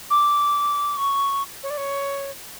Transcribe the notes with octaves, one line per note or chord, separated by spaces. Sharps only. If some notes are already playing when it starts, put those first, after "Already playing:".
D6
C#6
C#5
D5
C#5